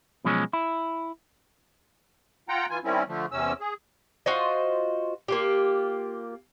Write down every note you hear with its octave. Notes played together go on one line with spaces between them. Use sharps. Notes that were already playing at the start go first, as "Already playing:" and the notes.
B2 F3 F#3 G#3 C#4
E4
F4 F#5 G5 A#5
E3 F4 G#5
D#3 G3 C4 C#4 E4
D3 F3 A3
E2 C3 C#4 E6
G#4
F4 F#4 C5 D#5
A#3 F4 G4